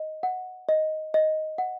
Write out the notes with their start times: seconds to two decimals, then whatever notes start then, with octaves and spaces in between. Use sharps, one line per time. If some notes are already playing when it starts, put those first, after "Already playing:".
Already playing: D#5
0.23 F#5
0.69 D#5
1.14 D#5
1.58 F#5